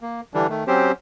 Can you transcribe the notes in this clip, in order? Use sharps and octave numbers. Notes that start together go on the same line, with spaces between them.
A#3
D3 E3 G3 D4
D#3 A3
F#3 C4 C#4 G4 C5